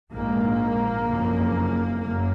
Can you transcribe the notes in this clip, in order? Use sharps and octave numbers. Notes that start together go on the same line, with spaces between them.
A#1 G#2 A#3
F#1 F2 C#3
F#1 F#2 A#3